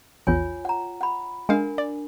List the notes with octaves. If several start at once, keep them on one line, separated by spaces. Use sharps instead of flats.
A#1 E2 F4 C#5 G#5
F#5 A#5
F#5 B5
G#3 D4 A#4 F5 G#5
D5